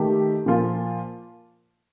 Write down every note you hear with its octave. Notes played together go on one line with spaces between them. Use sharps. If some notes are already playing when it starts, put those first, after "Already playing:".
Already playing: D#3 A3 D#4 G4
A#2 F3 A#3 F4